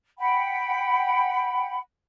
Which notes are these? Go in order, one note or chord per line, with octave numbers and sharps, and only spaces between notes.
F#5 G5 B5